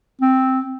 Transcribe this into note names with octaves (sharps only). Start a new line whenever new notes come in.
C4